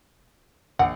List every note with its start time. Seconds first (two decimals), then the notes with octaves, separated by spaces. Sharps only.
0.79 A#1 F#5